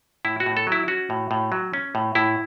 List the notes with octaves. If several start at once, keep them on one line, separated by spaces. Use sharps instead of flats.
A2 E4
F#4
A2
A4
F#3 E4
C#4 F#4
A2
A2
F#3
C#4
A2
A2 E4